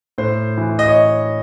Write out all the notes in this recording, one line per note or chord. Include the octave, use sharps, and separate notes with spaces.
A2 C5
E3
D#5
C#5